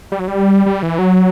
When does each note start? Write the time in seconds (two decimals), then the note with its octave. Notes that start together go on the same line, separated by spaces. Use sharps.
0.12 G3
0.19 F#3
0.28 G3
0.66 G3
0.83 E3
0.99 F#3